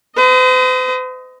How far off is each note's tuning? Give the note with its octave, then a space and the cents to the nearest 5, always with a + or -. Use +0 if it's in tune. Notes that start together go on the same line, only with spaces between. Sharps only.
C5 -45 D#5 +15